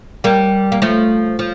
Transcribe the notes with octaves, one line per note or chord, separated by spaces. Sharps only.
G3 A#3
A#3
F3 A3
F3